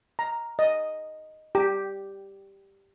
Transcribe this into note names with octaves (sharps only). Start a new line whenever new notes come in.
A#5
D#5
G4